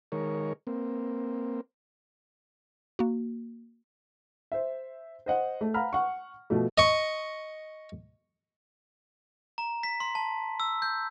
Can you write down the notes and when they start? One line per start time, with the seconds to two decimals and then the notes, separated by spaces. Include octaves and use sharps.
0.12 D#3 G#3 A#4 C#5
0.67 A#3 C4
2.99 A#3 F#4
4.52 C5 E5
5.26 C5 D#5 F#5
5.61 A3
5.74 F5 F#5 A#5 B5 F6
5.93 F#5 C#6
6.50 B2 F3 A3
6.78 D#5 C#6
9.58 A#5
9.83 B6
10.00 C6
10.15 A5
10.60 E6
10.82 G6